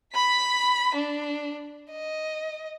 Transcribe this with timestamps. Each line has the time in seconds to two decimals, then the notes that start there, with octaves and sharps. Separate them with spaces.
0.14 B5 B6
0.95 D4
1.91 D#5